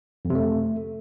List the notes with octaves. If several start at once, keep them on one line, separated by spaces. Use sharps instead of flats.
F2
C3
A3